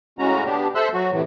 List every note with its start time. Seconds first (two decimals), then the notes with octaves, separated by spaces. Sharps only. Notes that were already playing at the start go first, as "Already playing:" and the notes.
0.19 A2 C#3 G#3 C#4 F#4 A#5
0.45 B3 D4 G4
0.75 A4 C5 E5 C6 E6 F#6
0.93 F#3 F#4
1.12 A2 C3 E3